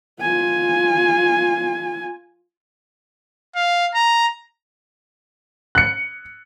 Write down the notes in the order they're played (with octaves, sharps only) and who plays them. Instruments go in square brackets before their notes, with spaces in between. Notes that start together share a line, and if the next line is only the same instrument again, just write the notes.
[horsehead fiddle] F4 G#5
[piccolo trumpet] F5
A#5
[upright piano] F#6 C#7